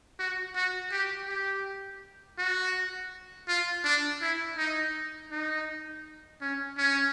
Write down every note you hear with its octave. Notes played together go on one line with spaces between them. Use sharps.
F#4
F#4
G4
G4
F#4
F4
D4
E4
D#4
D#4
C#4
C#4